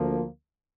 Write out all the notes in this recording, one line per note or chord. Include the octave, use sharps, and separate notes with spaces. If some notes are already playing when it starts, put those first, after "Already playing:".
Already playing: D2 F3 A#3